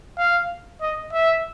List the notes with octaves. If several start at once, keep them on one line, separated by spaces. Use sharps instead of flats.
F5
D#5
E5